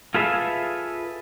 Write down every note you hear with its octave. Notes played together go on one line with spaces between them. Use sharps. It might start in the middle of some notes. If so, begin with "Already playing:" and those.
F4 G#4 A4 B4 E5 F5